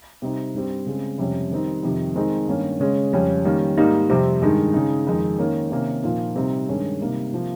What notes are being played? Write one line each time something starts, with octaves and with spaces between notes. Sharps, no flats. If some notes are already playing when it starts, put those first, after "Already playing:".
C3 G3 C4 D#4
G2 G3 C4
C#3 G#3 C4
F2 C3 G3 C#4
D#3 G3 C4 D#4
F2 C3 D#3 G3
D#3 G#3 C4 D#4
G2 D#3 A#3 C#4
C#3 G#3 C#4
F2 C#3 G3 C#4
D#3 G3 A#3 C#4
G#2 G3 A#3 D#4
F2 C3 G3 C4
G2 D#3 G#3 D#4
C#3 G#3 D#4
F2 D#3 G#3 D#4
D#3 A#3 C#4
C3 D#3 A#3 C#4
A#2 F3 A#3 D#4
C3 G3 C4 D#4
G2 D#3 G#3 C#4
C3 G3 A#3 D#4
C3 F3 A#3